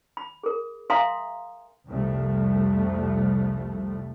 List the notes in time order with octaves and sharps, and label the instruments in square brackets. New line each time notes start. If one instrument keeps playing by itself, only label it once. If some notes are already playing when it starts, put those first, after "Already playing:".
[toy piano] B5
G#4 A#4
E5 F5 G#5 A#5 C6 D#6
[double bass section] C2 F2 F3 A3